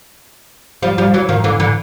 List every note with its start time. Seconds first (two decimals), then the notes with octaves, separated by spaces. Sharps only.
0.83 F3 G3
0.98 F3 G3
1.14 E3 F#3
1.29 D#3 F3
1.44 D3 E3
1.60 D3 E3